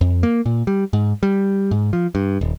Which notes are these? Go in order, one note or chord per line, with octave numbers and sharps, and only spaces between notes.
F2
A#3
A#2
G3
G#2
G3
G#2
F3
G2
D#1